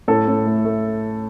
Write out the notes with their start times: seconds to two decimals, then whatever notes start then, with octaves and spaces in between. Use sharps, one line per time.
0.08 A2 A4
0.28 A2
0.46 A3
0.65 A3